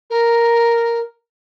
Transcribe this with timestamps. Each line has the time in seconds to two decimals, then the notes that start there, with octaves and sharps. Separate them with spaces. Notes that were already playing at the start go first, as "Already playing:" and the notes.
0.10 A#4